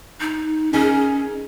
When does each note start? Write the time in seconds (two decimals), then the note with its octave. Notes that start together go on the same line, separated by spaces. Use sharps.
0.21 D#4
0.73 C#4 D#4 G#4 A#4